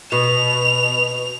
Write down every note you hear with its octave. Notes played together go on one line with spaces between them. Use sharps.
B2 F7